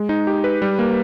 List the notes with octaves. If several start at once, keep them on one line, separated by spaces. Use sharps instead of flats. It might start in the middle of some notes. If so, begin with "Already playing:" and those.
Already playing: G#3
D#4
G4
B4
G3
A#3